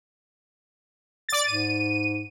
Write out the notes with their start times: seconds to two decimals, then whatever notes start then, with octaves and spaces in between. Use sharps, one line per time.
1.29 D5 A6
1.47 G#2 D#7